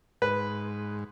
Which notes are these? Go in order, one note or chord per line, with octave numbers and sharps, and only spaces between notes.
G#2 B4